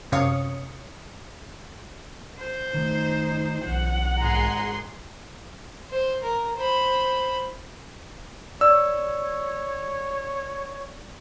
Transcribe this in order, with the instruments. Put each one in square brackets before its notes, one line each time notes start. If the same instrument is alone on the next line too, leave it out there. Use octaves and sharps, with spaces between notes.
[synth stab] F#2 C3 C#5 F5 D#6 C#7
[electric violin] C5
[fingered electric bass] D#3 A3 [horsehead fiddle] D#4
[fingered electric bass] B1 E3 D4 [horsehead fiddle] F#5
[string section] G#1 G#4 C6 [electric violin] A#5
[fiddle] C5
A#4
C5 B5
[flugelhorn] C#5 [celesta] D5 [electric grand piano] E6